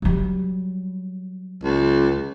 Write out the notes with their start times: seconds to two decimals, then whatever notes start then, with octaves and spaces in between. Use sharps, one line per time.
0.02 F#3 G3
1.64 C#2